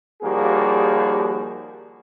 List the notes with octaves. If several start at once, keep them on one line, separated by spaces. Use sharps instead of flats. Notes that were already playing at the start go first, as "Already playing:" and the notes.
D#2 F3 G3 A#3 F#4 G#4